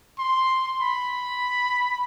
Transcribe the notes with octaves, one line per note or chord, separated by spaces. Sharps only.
C6
B5